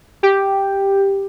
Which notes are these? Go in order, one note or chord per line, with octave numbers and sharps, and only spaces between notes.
G4